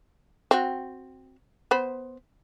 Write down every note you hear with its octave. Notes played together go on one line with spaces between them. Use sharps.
C4 F#4
B3 C5 B5